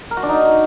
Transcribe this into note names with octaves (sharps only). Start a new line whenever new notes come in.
A#4
F#4
D4
D#4